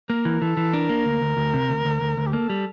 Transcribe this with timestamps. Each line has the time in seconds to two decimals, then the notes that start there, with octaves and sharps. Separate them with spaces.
0.09 A#3 A#4
0.25 E3
0.42 E3 A4
0.57 E3
0.73 D4 A#4
0.89 A#3
1.06 D2
1.21 D2
1.37 D2
1.54 C3
1.69 D2
1.85 D2
2.01 D2
2.17 D2
2.26 G4
2.33 A#3 A4
2.50 G3